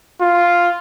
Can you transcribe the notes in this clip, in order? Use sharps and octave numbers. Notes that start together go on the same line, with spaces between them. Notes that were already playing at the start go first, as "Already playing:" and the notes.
F4